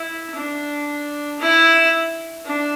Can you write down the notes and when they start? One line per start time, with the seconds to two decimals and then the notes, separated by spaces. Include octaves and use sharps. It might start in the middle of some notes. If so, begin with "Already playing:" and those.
Already playing: E4
0.35 D4
1.40 E4
2.45 D4